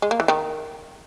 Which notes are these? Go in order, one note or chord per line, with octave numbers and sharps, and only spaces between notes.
G#3
A#3
E3
D#3